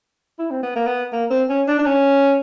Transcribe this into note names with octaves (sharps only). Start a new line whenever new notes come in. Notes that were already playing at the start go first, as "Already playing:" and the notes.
E4
C4
B3
A#3
B3
A#3
C4
C#4
D4
D4
C#4